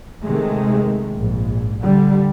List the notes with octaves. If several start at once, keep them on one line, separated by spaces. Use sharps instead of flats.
C3 D#3 G#3 A3
A#1 G#2
D3 G3